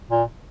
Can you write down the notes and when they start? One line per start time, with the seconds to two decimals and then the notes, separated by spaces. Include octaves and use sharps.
0.11 A#2